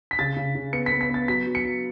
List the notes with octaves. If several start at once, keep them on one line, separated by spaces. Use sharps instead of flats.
B6
C#3 A6
C#3
C#3
B3 C#7
B6
B3
B6
B3 A6
F#3 B6
F#3
C#7
F#3